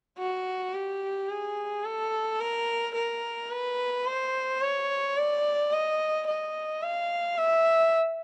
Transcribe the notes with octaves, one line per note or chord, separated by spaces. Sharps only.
F#4
G4
G#4
A4
A#4
A#4
B4
C5
C#5
D5
D#5
D#5
F5
E5